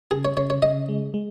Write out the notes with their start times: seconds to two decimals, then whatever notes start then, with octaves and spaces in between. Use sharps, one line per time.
0.11 C#3 G#4
0.25 C#5
0.37 C#3 C#5
0.50 C#5
0.62 C#3 D#5
0.89 G#3
1.14 G#3